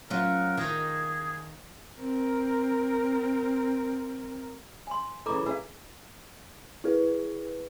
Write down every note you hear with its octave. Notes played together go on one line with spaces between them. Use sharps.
F#3 C#4 F4 A#4
D#3 G#4
C4 A#4
G#5 C6
E2 C#3 A4 A#5 D6
G#4 B4 F5
E4 G#4 B4